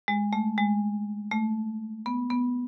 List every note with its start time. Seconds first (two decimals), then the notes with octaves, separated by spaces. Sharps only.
0.08 G#3
0.33 A3
0.58 G#3
1.31 A3
2.06 B3
2.30 B3